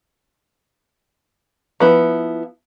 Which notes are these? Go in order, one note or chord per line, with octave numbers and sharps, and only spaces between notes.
F3 B3 E4